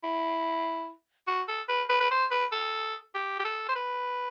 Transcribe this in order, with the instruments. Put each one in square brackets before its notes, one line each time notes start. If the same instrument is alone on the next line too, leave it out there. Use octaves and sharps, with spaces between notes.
[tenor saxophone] E4
F#4
A4
B4
B4
B4
C5
B4
A4
G4
G4
A4
C5
B4